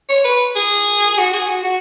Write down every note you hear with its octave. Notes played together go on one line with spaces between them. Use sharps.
C#5
B4
G#4
F#4
G#4
F#4
F#4